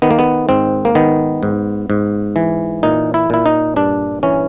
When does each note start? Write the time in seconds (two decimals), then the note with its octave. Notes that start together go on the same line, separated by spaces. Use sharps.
0.02 D#3 B3
0.11 A#3
0.19 B3
0.49 G#2 C4
0.85 A#3
0.95 D#3 B3
1.43 G#2
1.90 G#2
2.36 E3
2.83 A#2 D#4
3.14 E4
3.30 A#2 E4
3.46 D#4
3.76 G2 D4
4.23 E3 C#4